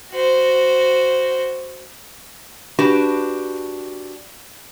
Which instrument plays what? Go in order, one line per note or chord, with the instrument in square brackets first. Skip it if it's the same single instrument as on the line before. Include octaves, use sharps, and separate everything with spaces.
[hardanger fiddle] F#4 C5
[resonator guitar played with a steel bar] D4 F#4 G4 B4